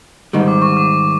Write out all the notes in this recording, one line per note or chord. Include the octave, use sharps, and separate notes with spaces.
G#2 D#3 G3
D6
C#6
D6